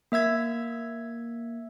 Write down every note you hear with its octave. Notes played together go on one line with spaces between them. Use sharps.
A#3 E5 E6 G#6 B6